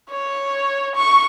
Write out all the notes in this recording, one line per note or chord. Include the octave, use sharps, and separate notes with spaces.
C#5
C#6